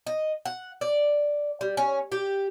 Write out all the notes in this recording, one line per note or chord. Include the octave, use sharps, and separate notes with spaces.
D#5
F#5
D5
G3
C#4
G4